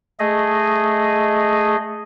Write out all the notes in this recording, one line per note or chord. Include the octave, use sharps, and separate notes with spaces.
A3 G#4 D#5